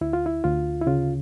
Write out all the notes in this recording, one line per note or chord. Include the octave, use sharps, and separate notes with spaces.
D2 E4
F4
E4
D2 F4
E4
C#3 F4